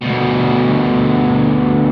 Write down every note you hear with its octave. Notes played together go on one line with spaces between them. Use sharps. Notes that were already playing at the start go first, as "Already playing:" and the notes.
D2 B2